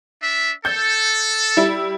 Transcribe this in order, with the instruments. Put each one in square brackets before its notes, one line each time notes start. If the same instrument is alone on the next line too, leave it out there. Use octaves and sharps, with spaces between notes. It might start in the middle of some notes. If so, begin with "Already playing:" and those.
[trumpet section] D4 E5
[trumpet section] A4 [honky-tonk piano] G6
[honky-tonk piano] G3 E4